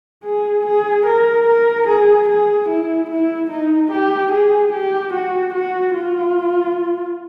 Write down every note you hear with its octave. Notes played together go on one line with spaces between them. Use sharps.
G#4
G#4
A#4
A#4
G#4
G#4
E4
E4
D#4
G4
G#4
G4
F#4
F#4
F4